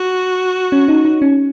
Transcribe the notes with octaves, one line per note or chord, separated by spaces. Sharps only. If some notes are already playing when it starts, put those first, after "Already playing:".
Already playing: F#4
C#4
D#4
D#4
C#4